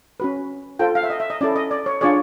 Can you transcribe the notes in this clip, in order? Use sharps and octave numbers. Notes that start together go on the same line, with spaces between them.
C#4 F#4 B4
F4 A4 C5 G5
F5
E5
D#5
E5
D#5
C#4 E4 A4 D5
D#5
D5
C#5
D4 F4 G#4 C#5 D5